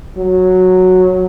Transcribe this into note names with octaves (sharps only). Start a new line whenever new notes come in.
F#3